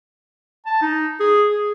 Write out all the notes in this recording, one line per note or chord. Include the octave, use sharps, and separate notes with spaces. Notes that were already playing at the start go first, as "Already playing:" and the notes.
A5
D#4
G#4
G#4